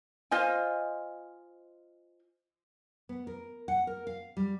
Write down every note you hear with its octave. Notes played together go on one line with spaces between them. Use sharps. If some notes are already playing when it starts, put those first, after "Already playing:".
F4 C5 D#5 G#5
B3
A#4
F#5
A#4
F5
G3